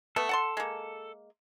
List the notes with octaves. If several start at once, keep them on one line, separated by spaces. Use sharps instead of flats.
A3 B3 A4
F#5 A5 C6
G#3 A#3